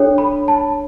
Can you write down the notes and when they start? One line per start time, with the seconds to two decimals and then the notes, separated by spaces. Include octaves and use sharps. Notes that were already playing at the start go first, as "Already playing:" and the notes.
Already playing: D4 A4 C#5
0.18 B5
0.48 A5